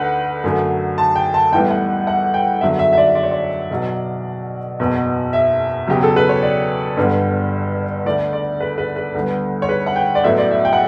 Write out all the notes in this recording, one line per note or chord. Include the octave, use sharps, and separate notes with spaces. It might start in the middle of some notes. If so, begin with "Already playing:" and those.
Already playing: D2 D3 A3 B4 F#5
F#2 D3 F#3 A3
A5
G5
A5
A1 A2 E3 G3 B3 G5
F#5
F#5
G5
F#1 E2 D3 F#3 E5
E5
E5
D5
D5
C#5
D5
B1 B2 F#3
F#1 E2 B2
E5
E2 C#3 F#3 G4
A4
B4
C#5
D5
G1 G2 D3 G3 B3
D2 D3 A3 D5
D5
B4
B4
B4
D2 D3 G3 B3
C#5
B4
F#5
G5
D5
A1 A2 F#3 B3 E5
D5
E5
G5
F#5